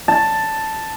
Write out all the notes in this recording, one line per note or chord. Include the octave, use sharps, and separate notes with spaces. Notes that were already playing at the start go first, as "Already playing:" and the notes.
A5